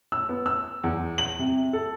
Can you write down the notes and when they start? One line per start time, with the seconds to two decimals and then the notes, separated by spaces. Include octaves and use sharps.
0.12 E6
0.29 B3
0.46 E6
0.84 E2
1.18 F#7
1.39 C3
1.73 A4